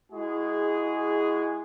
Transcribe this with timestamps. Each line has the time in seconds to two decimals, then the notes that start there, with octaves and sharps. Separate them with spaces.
0.12 G#3 E4 F#4 G#4